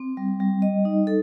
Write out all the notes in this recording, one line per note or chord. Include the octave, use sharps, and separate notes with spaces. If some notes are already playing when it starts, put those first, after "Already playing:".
Already playing: C4
G3
G3
D#5
D#4
A4